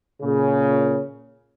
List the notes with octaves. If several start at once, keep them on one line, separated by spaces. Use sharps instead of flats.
A#2 C#3